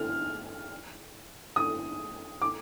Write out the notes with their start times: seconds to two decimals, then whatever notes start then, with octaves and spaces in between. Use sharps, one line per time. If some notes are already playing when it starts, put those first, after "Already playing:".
Already playing: F6
1.56 D#6
2.42 D6